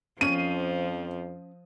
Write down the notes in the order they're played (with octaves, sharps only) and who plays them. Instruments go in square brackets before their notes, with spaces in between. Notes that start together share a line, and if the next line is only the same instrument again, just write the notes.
[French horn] F2 [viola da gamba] F3 [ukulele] C#4 [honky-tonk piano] D#7